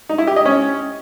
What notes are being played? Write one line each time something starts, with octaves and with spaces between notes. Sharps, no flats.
D#4
E4
G4
D#5
C#4